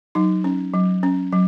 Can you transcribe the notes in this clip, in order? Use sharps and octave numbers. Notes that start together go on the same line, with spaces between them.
F#3 D#4
C#4
F#3
C#4
F#3